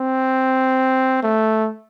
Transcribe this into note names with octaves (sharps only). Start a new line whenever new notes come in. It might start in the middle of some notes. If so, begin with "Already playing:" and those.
Already playing: C4
A3